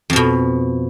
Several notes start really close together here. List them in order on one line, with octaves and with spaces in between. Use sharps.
F2 F3 B2